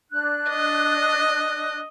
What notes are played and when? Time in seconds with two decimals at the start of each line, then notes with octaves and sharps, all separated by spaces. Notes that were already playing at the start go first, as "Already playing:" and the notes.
0.11 D4 F#6
0.50 D#5